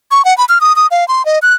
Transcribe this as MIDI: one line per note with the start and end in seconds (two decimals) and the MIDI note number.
0.11 0.25 85
0.25 0.36 78
0.38 0.45 83
0.49 0.61 89
0.61 0.75 87
0.76 0.87 87
0.91 1.07 77
1.08 1.25 84
1.25 1.39 75
1.42 1.54 90